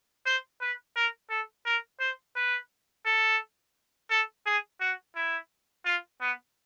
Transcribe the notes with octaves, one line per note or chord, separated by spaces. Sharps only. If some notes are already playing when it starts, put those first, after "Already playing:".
C5
B4
A#4
A4
A#4
C5
B4
A4
A4
G#4
F#4
E4
F4
B3